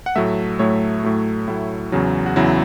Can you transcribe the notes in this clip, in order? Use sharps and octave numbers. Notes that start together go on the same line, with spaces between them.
F#5
A2 F#3 A3 E5
A2 F#3 A3 C#5
A2 F#3 A3
A2 F#3 A3 E4
E2 C#3 F#3
F#4
E2 C#3 F#3 E4